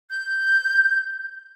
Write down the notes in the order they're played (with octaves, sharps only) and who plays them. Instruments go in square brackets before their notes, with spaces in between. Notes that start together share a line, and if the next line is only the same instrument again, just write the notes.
[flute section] G6